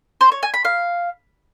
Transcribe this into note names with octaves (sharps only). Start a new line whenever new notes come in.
C5
C#5
G#5
B5
F5